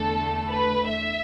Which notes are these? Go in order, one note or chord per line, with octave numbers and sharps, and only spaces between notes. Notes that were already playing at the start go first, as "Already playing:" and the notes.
Already playing: E2 D3 A3 A4
B4
E5